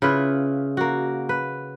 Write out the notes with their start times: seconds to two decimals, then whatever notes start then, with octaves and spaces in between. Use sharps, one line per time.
0.02 C#3 E4 F4 B4
0.77 A#3 F#4
1.29 B4